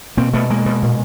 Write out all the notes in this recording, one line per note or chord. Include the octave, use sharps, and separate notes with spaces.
B2 A#3 C4
B2 A3 B3
B2 G#3 A#3
B2
A#2